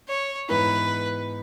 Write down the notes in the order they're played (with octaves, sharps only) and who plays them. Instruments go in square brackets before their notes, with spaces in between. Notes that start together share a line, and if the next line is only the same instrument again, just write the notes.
[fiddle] C#5
[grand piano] G#2 E3 B3 E4 [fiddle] B4